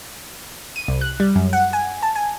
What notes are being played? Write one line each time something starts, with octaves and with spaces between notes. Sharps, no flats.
D#7
C2
F#6
G3
F#2
F#5
G#5
A5
G#5